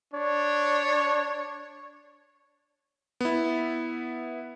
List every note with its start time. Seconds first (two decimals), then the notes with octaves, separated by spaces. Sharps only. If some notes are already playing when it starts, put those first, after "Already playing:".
0.14 D4 C#5
3.21 B3 E4